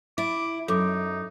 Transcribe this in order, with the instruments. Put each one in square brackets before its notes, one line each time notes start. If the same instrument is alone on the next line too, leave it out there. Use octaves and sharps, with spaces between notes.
[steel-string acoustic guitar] E4 [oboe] D6
[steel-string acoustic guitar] F#2 [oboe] D#4 [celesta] A4 D6